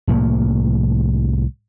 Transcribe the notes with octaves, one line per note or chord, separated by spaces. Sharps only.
C2 A2 F3 A#3